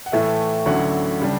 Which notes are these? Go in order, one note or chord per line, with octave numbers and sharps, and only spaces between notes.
F#5
A2 E3 A3 E5
D2 D3 F#3 C#4 E4 F#5
C#3 G3 D4